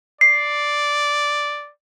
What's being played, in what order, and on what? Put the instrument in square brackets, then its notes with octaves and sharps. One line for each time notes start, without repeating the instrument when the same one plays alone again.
[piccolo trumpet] D5 [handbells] C7